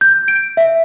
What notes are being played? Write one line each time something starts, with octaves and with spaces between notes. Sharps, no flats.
G6
D7
E5